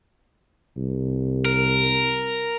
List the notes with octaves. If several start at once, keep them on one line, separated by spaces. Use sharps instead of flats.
C2
A#4